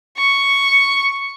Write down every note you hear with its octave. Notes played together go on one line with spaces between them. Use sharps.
C#6